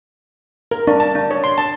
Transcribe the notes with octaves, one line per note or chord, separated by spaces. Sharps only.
A#4
D4
A5
D4
C#5
C6
A5